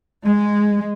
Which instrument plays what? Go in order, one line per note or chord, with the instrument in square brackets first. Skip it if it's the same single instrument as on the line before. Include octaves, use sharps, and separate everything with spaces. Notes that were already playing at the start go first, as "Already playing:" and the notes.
[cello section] G#3